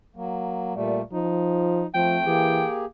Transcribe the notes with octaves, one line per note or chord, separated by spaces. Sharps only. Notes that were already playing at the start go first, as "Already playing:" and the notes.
F#3 A#3
A#2 G3 A3
F3 D#4
F3 A3 C4 G5
E3 A#3 G4 G#4